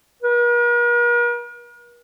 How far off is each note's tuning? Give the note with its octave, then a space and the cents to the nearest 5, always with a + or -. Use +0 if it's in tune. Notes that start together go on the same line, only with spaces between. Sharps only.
A#4 +45